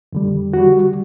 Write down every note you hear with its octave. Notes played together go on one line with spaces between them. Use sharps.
F2 D3 G3
D3 G3 F#4